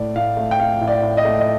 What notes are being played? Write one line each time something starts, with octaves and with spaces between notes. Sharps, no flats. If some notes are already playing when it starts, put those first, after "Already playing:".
Already playing: A2 A3 D5
A2 F5
A3
G5
A3 F5
A2
D5
A2
D#5
A3
D#5